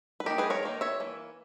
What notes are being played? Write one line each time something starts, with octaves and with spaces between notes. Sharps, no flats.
B4
D#3 A#3 D#4 G4 A#4
G#4 B4
A#4 C#5
D#3 A#3 D#4
C#5 E5
E3 A#3